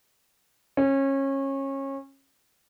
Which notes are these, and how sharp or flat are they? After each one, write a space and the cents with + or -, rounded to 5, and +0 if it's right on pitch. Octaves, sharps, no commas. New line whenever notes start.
C#4 -25